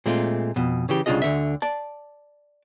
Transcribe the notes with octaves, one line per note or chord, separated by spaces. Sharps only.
A#2 G#3 A3 C4 F4
F2 B2
C#3 E3 G4
C2 C#3 D4 F4 G#4 D#5
D2 D3 E5
D5 A5